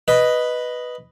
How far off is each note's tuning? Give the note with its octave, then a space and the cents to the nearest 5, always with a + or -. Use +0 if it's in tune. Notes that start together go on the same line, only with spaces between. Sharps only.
B4 +0 D#5 +0